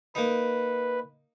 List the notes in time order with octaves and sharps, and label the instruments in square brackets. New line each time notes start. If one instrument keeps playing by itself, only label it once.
[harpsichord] A#3 D#4 [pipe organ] B4